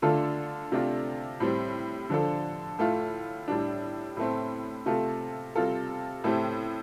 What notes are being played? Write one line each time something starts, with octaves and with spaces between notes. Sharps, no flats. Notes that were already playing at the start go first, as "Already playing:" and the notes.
D3 A3 D4 F4 A4
C3 A3 D4 F4
A2 G3 C4
D3 F3 D4 A4
A2 A3 F4
A2 G3 D4
A2 A3 C4
C3 A3 F4 A4
C3 G3 F4 A4
A2 A3 C4 G4